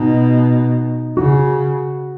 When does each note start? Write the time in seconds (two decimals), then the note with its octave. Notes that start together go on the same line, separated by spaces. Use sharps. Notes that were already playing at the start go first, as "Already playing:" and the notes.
Already playing: B2 D#4
1.17 C#3 F#4